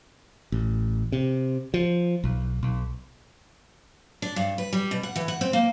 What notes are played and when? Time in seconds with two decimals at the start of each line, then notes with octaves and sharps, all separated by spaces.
0.52 A1
1.12 C3
1.74 F3
2.24 B1
2.63 B1
4.22 D4
4.36 G2
4.58 B4
4.73 G3
4.91 B2
5.03 F#5
5.16 E3
5.28 F#5
5.41 C4
5.53 A#3